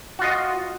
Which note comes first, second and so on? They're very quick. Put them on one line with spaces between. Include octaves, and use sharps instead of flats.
F#4 F4 D#5